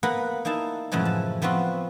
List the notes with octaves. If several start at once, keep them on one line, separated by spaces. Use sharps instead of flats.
A#3 B3 B4 F#5 A#5
A#3 D#4 E4 A5
F#2 A2 C#3 E3 F3 G#3
A5
F3 B3 C4 F4 F#4